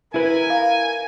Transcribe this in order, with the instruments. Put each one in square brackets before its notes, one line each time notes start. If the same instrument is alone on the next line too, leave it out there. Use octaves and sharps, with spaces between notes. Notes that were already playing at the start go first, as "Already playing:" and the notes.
[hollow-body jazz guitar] E4 B4 [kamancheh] A#4 [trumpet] G#5
[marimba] F5